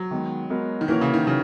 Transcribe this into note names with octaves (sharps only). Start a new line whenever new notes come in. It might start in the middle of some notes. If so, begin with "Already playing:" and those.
Already playing: F#3
D#3 G#3 B3
G#3 B3 F#4 A#4
D#3
A#2 E3 A#3 C#4 F#4 A#4
C#3
D#3
C#3 F#3 C#4